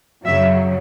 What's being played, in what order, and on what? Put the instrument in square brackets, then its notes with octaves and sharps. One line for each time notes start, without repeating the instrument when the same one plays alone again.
[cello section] F#2 C#3 F#3 E5